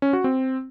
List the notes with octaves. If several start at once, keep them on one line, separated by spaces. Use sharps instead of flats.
C#4
F#4
C4